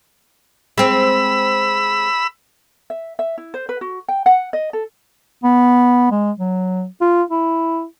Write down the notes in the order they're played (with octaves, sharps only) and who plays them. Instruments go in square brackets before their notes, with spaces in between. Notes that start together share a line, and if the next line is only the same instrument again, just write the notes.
[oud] G#3 C4 [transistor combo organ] B5 E6
[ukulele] E5
E5
E4
C5
B4
F#4
G5
F#5
D#5
A4
[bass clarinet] B3
G#3
F#3
F4
E4